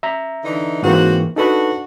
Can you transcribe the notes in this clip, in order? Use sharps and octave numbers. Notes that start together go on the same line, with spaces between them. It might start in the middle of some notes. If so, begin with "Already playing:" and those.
E5 A#5
D3 E3 D#4
G#2 E3 A#3 C4 F#4
D4 D#4 F#4 A4 B4